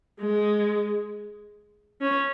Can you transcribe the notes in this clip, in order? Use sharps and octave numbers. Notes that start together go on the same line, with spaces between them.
G#3
C#4